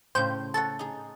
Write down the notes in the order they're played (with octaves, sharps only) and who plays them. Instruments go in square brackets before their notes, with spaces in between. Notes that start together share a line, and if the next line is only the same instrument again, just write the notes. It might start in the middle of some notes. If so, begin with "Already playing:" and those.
[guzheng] A2 C#3 [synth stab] C5 G5
[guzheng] A4 C#5 F#5 [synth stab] A5
[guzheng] D#4 G#4